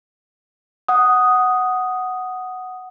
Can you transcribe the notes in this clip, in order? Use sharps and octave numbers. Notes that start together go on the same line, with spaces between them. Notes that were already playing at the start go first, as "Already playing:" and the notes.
F#5 D#6